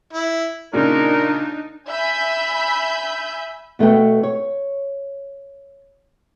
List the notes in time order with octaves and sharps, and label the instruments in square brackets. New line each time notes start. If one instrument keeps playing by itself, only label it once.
[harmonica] E4
[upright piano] A#2 C#3 [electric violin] D4 D#4 [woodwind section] A#4
[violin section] E5 G#5 B5 G6
[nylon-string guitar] B2 A3 B3 G5
C#5